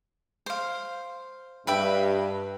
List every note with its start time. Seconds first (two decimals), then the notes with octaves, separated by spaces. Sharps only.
0.46 C5 F5
1.67 G2 B4 E5 G5